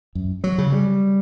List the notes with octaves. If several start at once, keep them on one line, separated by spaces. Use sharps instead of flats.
F#2
F#3
C#3
G3